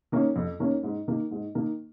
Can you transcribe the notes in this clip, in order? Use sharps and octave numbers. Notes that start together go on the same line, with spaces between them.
D#3 A#3 C#4
F2
D#3 A#3 C#4
G#2
D#3 A#3
G#2
D#3 A#3